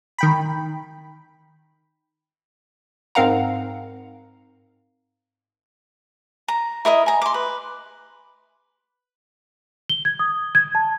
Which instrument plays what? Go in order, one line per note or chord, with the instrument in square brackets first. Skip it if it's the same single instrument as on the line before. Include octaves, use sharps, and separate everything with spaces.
[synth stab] D#3 G5 B5
[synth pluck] G#2 C4 A#4 F5 F#5 A#5
[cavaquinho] A#5
E4 A#4 D#5 D#6
G#5 A#5
C6 D6
B4
[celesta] G7
G#6
D#6
G#6
A5